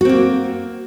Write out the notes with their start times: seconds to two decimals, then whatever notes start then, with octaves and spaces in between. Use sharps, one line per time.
0.01 F#4
0.05 C4
0.09 A#3